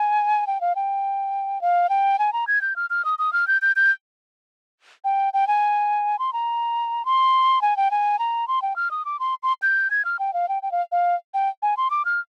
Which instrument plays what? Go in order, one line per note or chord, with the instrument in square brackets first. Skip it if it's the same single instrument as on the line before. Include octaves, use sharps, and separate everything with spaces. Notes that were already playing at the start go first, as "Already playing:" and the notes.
Already playing: [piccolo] G#5
G5
F5
G5
F5
G5
G#5
A#5
G#6
G6
F6
F6
D#6
D#6
F6
G6
G6
G6
G5
G5
G#5
C6
A#5
C6
G#5
G5
G#5
A#5
C6
G5
F6
D#6
D6
C6
C6
G6
G#6
F6
G5
F5
G5
G5
F5
F5
G5
G#5
C6
D6
F6